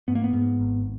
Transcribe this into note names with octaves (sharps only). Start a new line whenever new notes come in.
G#2 B3
A#3
B3
G#2
G#1